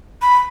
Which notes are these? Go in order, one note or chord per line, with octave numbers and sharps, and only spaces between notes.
B5